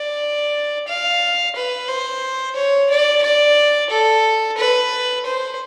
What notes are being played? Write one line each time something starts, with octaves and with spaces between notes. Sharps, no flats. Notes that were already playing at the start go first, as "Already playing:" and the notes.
Already playing: D5
F5
B4
C5
C#5
D5
D5
A4
B4
C5